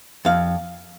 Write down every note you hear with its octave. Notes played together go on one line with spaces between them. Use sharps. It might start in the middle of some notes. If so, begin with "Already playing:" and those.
F2 F5